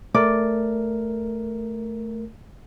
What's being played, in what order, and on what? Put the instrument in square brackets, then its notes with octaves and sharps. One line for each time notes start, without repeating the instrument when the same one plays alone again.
[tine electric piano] A3 A#4 [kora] D5